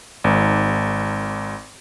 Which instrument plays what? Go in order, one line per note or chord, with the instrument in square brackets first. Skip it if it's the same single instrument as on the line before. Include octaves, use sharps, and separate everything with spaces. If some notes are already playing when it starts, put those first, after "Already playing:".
[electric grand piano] G#1 G#2